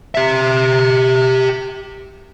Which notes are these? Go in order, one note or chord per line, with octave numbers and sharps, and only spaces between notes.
G4 E5